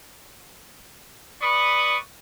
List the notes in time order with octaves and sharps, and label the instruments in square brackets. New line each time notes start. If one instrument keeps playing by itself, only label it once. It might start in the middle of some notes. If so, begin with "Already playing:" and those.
[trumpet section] B4 D5 B5 C#6 D#6